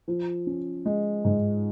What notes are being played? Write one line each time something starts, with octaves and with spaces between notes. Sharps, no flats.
F3
C#4
G#3
G#2